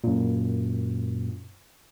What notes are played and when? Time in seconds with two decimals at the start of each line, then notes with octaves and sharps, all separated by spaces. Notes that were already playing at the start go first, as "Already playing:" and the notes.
0.04 F#2 A#2